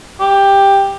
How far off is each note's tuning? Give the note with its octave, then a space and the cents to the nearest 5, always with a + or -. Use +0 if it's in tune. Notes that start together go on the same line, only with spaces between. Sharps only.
G4 +10